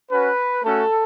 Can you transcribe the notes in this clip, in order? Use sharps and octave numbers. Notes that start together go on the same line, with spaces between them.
C#4 F#4 B4
A3 C#4 F#4 A4